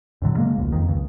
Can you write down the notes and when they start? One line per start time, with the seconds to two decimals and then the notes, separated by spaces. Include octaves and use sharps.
0.22 F#2 A2 D3 F#3
0.37 C#3 G#3 A#3
0.56 E1 C#2
0.72 F2 D#3
0.88 C#2